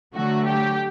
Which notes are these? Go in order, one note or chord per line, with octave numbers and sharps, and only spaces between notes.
D3 F#3 A3 F#4
G4